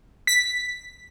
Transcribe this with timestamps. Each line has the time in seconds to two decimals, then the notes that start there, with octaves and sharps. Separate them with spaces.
0.27 B6